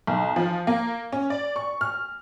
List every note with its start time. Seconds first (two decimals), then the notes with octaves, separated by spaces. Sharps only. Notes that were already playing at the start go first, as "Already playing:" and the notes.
0.07 B1
0.36 F3
0.67 A#3
1.12 C#4
1.30 D5
1.56 C#6
1.81 F6